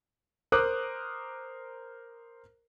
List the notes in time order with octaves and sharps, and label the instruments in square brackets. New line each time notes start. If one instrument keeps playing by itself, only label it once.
[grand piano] A#4 C5 D6 D#6 F#6